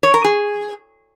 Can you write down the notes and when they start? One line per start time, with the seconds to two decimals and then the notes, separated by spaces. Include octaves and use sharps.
0.03 C#5
0.14 A#4
0.24 G#4